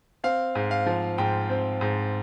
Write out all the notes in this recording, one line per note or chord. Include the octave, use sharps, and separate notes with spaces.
C4 F5
G#2
F5
F3
G#2 G5
C4
G#2